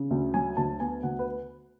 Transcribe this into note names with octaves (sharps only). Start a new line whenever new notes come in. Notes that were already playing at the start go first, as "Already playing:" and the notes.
Already playing: C#3
D2
F#3 G#5
D2 A5
B3 G#5
D2 F#5
B4